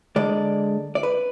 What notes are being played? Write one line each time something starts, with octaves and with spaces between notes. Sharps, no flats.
D3 G#3 D5
D5
B4